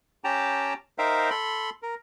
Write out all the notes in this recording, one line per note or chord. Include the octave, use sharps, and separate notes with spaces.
C#4 G4 G5 A5 A#5
D#4 A#4 C5 E5 F5 G5
A4 B5 C6
A#4